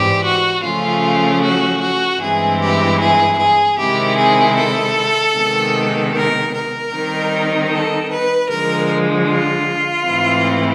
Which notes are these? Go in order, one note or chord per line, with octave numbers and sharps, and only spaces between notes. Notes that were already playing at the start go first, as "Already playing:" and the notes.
Already playing: G#2 E3 G3 C4 G4
F#4
C#3 F3 A3 C#4 F4
F#4
F#4
G2 E3 G#3 C4 E4 G#4
G4
G#4
G#4
C3 D#3 G#3 C4 E4 G4
G#4
A4
C3 D#3 G#3 B3
A#4
A#4
D#3 G3 C4 D#4
A4
B4
D3 F3 G#3 A#4
F4
G#2 E3 A3 C4 E4